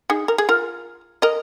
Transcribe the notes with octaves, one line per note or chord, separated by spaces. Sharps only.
D#4 G#4
A#4
G#4
F4 A#4
A#4 D#5